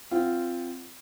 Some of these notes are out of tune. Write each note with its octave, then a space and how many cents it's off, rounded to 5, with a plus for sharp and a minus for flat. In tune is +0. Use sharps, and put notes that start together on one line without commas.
C4 +0 F4 -15 F#5 +0